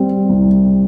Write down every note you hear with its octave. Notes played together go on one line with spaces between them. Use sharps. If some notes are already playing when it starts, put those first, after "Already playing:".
Already playing: G3 C4
C2